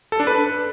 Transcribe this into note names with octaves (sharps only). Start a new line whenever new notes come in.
A4
D4
B4